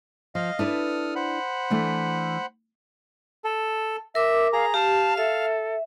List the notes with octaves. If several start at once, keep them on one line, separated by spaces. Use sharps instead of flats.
F3 D#5 F5
D4 E4 A4 B4 D#6 F6
C5 F#5 B5
E3 A3 D4
A4
A#4 E5 D6
G#4 F5 A#5
G4 F5 A5
A4 E5